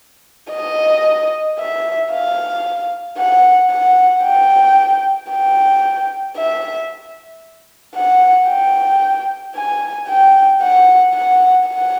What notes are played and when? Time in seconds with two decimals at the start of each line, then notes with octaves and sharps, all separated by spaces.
0.53 D#5
1.59 E5
2.12 F5
3.18 F#5
3.71 F#5
4.24 G5
5.31 G5
6.37 E5
7.96 F#5
8.50 G5
9.56 G#5
10.09 G5
10.62 F#5
11.15 F#5
11.68 F#5